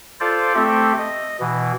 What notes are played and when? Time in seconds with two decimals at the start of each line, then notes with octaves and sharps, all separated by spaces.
0.20 F4 A4 C5 D5
0.55 A3 C4 G4 A4 E5
0.98 D#5
1.40 B2 E3